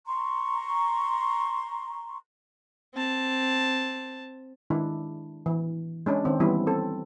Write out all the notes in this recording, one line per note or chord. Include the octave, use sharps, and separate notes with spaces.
A#5 C6 C#6
C4 A5
D#3 G#3 D4 E4
E3
G#3 C#4 D4
D#3 C4 D#4
E3 G3 B3 C#4 E4
C4 A4